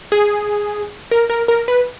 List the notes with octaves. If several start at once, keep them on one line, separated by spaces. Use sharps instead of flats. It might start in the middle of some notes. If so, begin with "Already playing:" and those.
G#4
A#4
A#4
A#4
B4